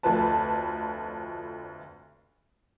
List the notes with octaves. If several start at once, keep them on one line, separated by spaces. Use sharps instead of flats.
F1 D2 F3 B4 A5